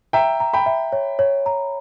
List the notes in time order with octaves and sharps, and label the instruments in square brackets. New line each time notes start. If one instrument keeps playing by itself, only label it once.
[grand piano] E5 G5 [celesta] A#5
[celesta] A#5
[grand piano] G5 B5
[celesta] E5
C#5
C#5
A#5